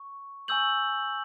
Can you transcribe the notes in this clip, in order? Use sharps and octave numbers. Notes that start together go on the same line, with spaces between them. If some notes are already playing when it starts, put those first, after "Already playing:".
Already playing: C#6
G#5 C#6 E6 G6 F#7